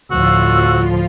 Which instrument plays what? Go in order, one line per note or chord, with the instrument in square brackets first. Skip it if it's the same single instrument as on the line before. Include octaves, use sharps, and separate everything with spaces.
[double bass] D2 A2 [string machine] F3 F4 [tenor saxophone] F#4 [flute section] E6